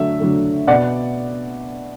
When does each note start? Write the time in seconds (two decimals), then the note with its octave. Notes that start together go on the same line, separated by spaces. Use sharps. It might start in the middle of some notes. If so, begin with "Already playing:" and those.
Already playing: D3 F#3 A3 E5
0.20 D3 F#3 A3
0.67 B2 D5 F#5
0.71 B3